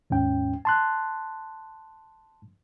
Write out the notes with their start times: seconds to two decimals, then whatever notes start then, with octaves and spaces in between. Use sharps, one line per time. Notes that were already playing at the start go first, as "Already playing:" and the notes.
0.10 D#2 G#2 C#4 G5
0.65 A5 C6 F#6